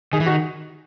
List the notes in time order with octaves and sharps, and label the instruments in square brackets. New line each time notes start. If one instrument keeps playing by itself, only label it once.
[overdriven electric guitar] D#3 [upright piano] G#4
[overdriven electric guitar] E3
[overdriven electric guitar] D#3 [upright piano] F#4